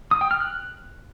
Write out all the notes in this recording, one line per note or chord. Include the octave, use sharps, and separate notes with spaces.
D#6
G5
F6
F#6